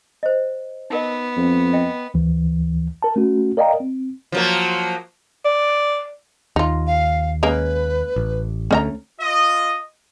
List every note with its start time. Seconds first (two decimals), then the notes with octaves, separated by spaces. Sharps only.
0.23 C5 D#5
0.90 B3 D#4 A#4 D#5
1.37 F2
1.73 D#5 G5
2.14 D2 E3
3.02 A#4 A5
3.16 A3 C#4 F#4
3.57 A#4 D5 D#5 F5 G5 A#5
3.80 C4
4.32 F3 F#3 A#3
5.45 D5
6.56 D#2 D#4 F4
6.87 F5
7.43 G#3 A#3 C#4 B4
8.16 A1
8.71 D2 G#3 A3 C#4 D#5 A#5
9.21 F4 D#5